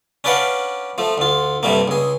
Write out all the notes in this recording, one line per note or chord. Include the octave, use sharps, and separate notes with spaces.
C#4 D4 B4 D5 F5 F#5
F3 A3
D2 F4
G2 C3 G3 A3 A#3
C#2 G#4